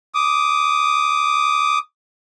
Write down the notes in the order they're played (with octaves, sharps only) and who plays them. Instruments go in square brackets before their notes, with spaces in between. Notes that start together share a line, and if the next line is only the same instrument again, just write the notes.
[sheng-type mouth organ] D6 D#6